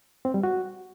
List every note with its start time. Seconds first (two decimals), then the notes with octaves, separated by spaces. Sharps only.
0.25 C4
0.34 G3
0.43 F#4